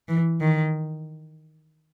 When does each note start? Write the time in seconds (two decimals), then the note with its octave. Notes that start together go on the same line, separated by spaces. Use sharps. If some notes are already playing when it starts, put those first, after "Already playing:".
0.09 E3
0.41 D#3